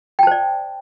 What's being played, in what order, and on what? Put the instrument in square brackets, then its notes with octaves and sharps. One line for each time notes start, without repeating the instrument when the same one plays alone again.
[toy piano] G5
A5
C5
D5